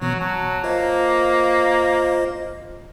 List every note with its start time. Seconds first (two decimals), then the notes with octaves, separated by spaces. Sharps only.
0.02 B2 E3 F#3 B3
0.21 F#3 A5
0.64 A#3 F4 C5 D#5